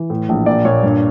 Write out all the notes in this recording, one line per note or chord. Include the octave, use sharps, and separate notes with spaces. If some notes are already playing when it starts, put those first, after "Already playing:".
Already playing: E3
A2
A#1
A#2 D5
A#2 C#5
G2